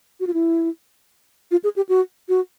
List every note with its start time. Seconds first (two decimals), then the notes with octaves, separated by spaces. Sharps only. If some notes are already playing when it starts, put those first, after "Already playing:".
0.20 F#4
0.27 F4
0.34 E4
1.51 F4
1.64 G#4
1.76 G4
1.89 F#4
2.29 F#4